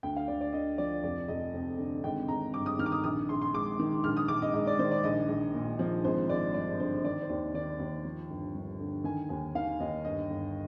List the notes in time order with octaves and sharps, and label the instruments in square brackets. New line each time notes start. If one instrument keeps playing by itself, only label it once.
[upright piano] D2 G5
F5
D2 D5
D5
D3 D#5
F3 D5
F1 D5
F1 D#5
F2
D3
G#1 G5
G#1 A#5
G2 D6
D#6
D#3 F6
D6
D#6
A#1 D#6
A#1 C6
C6
G#2 D6
D#3
A#1 F6
D#6
A#1 D6
D#5
G#2 D#5
D5
D#3 C5
D5
A#1 D#5
A#1
A#2
F3
G#1 C5
G#1 D5
G2 D5
D3 C5
D#3 D5
C5
D#2 D5
D#3 D5
D#2
F3
G1
G2
D3
D#3 G#5
D#2 G#5
D#3 F5
D#2 D#5
G1 D#5
G1